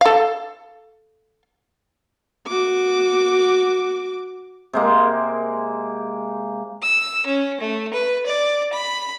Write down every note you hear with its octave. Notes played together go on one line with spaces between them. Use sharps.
A4 F5
F#4 D6
C3 G#3 A#3
E6
C#4
A3
B4
D5
B5